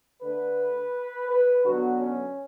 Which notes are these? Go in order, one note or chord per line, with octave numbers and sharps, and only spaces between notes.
D3 A3 B4
B4
D3 F#3 B3 F#4
C#4